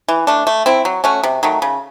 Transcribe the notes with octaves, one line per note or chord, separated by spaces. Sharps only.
E3
A3 D4
A3
C4 E4
F#3
A3 C#4 F#4
C3
D#3 F#3 A3
C#3